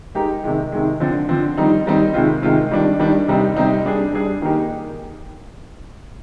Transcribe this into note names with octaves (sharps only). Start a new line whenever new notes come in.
G#3 D#4 G4 A#4
C3 D#3 G#3
C3 D#3 G#3
D3 F3 C4
D3 F3 C4
D#3 G3 C4 D#4
D#3 G3 C4 D#4
C3 D#3 G#3 C4 F4
C3 D#3 G#3 C4 F4
D#3 G3 D4
D#3 G3 D4
C3 G3 C4 D#4
C3 G3 C4 D#4
G3 D4 G#4
G3 D4 G#4
D#3 A#3 D#4 G4 A#4